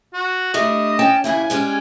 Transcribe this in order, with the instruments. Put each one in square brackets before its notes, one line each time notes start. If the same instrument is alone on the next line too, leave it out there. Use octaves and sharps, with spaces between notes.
[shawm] F#4
[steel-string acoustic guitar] G3 A3 D4 [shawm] D#5
[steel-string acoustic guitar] C#4 G5 A5
[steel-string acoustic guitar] D#2 C#3 E4 [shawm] G#5
[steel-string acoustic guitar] G3 G#3 C#4